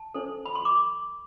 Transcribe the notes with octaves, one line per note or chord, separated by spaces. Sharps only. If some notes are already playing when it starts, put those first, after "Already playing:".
Already playing: A5
D4 A4 C5
B5
C6
D6